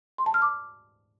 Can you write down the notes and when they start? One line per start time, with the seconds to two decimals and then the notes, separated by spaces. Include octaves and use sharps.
0.18 C6
0.26 A5
0.34 F6
0.42 D6